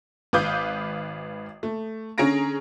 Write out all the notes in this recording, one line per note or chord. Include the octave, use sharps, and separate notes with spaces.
G#1 B4 F5 D6 D#6 G6
A3
D3 C#4 G#4 A#5 A#6 D7